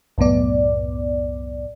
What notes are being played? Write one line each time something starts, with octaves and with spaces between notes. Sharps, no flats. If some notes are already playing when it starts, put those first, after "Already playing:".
C2 F#2 A2 B3 D5